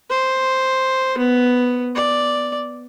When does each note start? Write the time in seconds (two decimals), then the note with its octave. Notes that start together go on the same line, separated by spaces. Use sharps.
0.10 C5
1.18 B3
1.96 D5